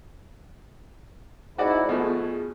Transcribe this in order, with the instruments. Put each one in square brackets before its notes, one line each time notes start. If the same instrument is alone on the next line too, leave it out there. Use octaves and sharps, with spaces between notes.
[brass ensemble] G#2 E4 [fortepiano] F#4 D5 F#5
[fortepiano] B2 F3 A3 [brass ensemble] G#4